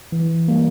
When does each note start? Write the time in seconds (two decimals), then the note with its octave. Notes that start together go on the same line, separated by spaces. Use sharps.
0.12 E3
0.48 G3 A#3